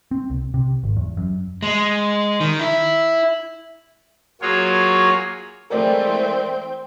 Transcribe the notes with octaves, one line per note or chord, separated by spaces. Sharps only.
C4
C2
C3
G#1
E2
F#2
G#3
D#3
E4
F#3 A#3 F4 F#4 G#4 C#5
E3 G#3 A3 C4 A#4 D5 G5